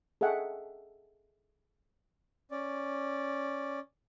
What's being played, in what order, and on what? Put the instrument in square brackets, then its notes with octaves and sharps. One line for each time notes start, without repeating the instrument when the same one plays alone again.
[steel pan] G#4 A4 D#5 E5 F#5 G5
[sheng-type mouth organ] C#4 D5